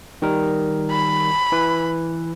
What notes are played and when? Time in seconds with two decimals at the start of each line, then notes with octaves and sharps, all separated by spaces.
0.22 D#3 G3 A#4
0.91 B5
1.52 E3 B4